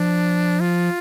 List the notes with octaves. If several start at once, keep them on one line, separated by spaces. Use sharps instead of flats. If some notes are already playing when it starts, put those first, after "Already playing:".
Already playing: F3 D4
F4